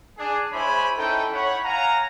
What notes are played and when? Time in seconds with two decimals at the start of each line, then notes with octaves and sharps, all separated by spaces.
0.18 D4 G#4
0.53 G#3 E4 C5 C#5 G#5 B5
0.98 C#4 D#4 E4 A4 G5
1.33 C#5 F#5 B5
1.64 F5 F#5 G#5 A#5